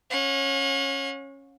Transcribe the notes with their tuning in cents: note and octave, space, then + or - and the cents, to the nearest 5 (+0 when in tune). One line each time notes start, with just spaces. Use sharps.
C#4 -15 F#5 -45